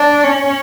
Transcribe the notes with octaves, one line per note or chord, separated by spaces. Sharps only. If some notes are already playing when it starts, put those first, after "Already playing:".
Already playing: D4
C#4